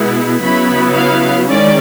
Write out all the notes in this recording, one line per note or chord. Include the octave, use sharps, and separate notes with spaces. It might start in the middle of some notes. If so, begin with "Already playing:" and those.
Already playing: B2 G#3 B3 E4
C#3 F#3 B3 E4 B5
F5
D#3 G#3 C#4 D5